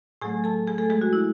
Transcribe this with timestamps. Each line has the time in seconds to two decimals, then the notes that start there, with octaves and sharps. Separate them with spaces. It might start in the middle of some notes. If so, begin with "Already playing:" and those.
0.21 A2 F#3 A3 G#4 G#5
0.44 A4 A5
0.67 G#4 G#5
0.78 A3 A4
0.90 G#3 G#4
1.01 F#4
1.13 E4